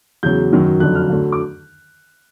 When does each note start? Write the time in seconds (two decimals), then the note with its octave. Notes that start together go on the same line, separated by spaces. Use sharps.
0.23 E2 C#3 F#3 G6
0.52 F#2 D#3 F#3
0.80 F2 D3 F#3 F#6
0.95 F6
1.09 D2 D3 F#3
1.32 D6